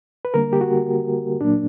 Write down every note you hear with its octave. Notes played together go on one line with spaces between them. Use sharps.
B4
D3 G3 A#3 A#4
G4
F#4
A#2 F#3 A#3 D4